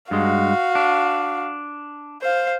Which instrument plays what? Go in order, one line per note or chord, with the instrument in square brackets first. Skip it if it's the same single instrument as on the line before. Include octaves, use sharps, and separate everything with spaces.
[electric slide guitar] G2 G#3 [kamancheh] F#4 F5
[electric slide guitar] D4
[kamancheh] C5 F5